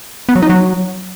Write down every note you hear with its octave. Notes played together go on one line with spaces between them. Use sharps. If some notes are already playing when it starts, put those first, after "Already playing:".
B3
F#3
D#4
F#3